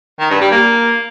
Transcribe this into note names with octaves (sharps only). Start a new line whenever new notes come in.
D#3
G2
G3
A#3